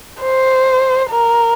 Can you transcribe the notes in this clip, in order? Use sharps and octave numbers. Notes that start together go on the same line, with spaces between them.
C5
A#4